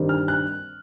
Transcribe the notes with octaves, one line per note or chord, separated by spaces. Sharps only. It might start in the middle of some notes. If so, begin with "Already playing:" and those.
Already playing: G2 D#3 G3 C4
F6
F#6